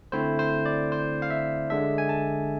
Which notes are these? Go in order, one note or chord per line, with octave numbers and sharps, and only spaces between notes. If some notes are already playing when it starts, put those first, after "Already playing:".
D3 A3 C4 E4 C5
C5
D5
C5
F5
E5
D3 G#3 D4 E5
G#5
A5